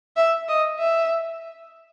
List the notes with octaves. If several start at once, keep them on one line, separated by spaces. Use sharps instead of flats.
E5
D#5
E5